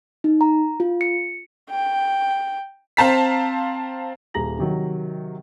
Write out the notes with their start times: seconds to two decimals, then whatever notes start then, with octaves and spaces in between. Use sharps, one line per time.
0.24 D#4
0.41 A#5
0.80 F4
1.01 C#7
1.70 G5
2.97 C4 C5 F5 A5 A#5 B6
4.34 D#1 G4 G#4 A#5 A#6 F#7
4.59 C3 D#3 F#3